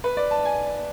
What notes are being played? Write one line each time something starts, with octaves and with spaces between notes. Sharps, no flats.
B4
D5
A5
G#5